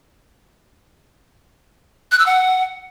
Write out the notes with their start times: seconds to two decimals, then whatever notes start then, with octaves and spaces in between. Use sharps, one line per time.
2.12 F#6
2.19 E6
2.26 F#5